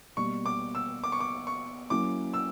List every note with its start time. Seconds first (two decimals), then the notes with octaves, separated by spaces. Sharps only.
0.17 B2 G3 A#3 C#6
0.46 D6
0.75 E6
1.04 D6
1.12 C#6
1.20 D6
1.47 C#6
1.90 F#3 A#3 C#4 E4 A#4 D6
2.34 E6